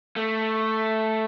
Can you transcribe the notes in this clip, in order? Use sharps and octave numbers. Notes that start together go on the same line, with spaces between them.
A3